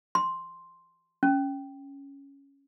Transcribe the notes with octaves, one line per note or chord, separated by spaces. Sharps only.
C6
C#4